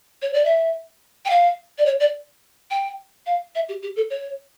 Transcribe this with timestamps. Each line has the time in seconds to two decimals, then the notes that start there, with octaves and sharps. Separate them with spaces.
0.22 C#5
0.34 D5
0.45 E5
1.25 G5
1.30 F5
1.78 D5
1.86 C#5
2.00 D5
2.71 G5
3.26 F5
3.55 E5
3.69 G4
3.83 G4
3.96 A4
4.10 C#5